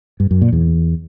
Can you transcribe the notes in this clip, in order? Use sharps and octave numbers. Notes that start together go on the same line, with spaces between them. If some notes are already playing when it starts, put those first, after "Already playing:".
G2
F#2
A#2
E2